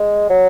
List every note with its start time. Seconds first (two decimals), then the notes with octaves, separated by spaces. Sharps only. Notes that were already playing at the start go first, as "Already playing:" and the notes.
Already playing: G#3
0.30 F#3